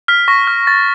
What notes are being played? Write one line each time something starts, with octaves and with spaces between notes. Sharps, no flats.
F6 B6
C#6 A#6
F6
C#6 A6